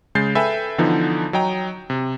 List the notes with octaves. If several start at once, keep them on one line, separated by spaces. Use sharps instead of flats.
C#3 G#3 G6 A6 C7
A4 B4 E5 G5 G#5 B5
D3 E3 F3 B3 D#4
F#3 D#5 G5 A#5
C3